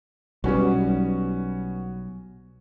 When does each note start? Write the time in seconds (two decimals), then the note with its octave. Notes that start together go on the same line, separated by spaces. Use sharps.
0.44 B1 G3 B3 C#4 F#4